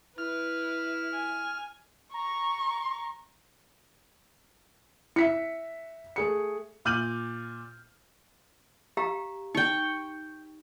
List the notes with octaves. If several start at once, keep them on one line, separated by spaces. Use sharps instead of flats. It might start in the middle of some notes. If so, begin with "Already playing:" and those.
E4 B4 F6
G#5
A#5 C#6
E4 E5 B6 C#7
A3 G#4 C#7
A#2 D6 F6 G6 D#7 F#7
G4 F5 A#5
D#4 G5 C#6